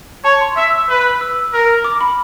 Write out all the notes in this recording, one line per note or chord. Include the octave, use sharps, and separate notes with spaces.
C#5 A5
C6
E5 E6
B4
E6
A#4
D6
B5